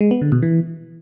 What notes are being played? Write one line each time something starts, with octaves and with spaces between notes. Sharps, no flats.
G#3
B3
D3
B2
E3